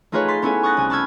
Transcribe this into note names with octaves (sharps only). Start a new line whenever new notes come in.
A3 D#4 F4 G#4 B4 C#5
C6 A6 B6
B3 C#4 E4 A4 G#5
C#6 D#6 F#6 A6 A#6 C#7
C2 G#5
A5 B5 C#6 E6 F6 G#6